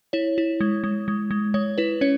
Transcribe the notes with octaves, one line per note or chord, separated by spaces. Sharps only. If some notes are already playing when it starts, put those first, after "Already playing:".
E4 C#5
E4
G#3
G#3
G#3
G#3
G#3 C#5
E4 B4
C#4 C#5